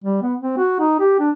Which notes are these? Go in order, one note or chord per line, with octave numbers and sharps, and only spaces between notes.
G3
B3
C4
F#4
D#4
G4
D4